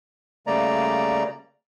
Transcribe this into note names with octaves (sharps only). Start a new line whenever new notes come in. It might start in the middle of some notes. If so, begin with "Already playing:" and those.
C#3 G3 A3 A#3 D5 A#5